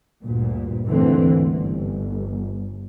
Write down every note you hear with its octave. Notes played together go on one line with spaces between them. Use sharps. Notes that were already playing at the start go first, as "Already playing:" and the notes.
D2 G2 A#2
G#1 D#2 D3 E3 A3 C4
G1